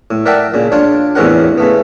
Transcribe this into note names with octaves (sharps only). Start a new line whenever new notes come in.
A2
A#4 D5 E5 F#5 G5 A5
A#2 C#3
D4 F4 C#5 D5
E2 A2 C3 C#4 A#4 F#5
C#3 A3 B3